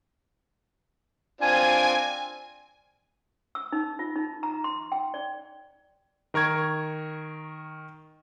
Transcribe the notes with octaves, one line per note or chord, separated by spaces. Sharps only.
C4 D4 F4 G#5
E6
D#4
F4
D#4
A#5
C6
G5
D5
D#3 A#4 C#6 G#6